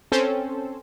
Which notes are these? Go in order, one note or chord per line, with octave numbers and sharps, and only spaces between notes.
C4 C#4 A4 C5